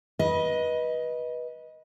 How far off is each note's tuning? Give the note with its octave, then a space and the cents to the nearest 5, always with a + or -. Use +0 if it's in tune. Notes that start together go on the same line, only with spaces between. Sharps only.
B4 -20 D#5 +10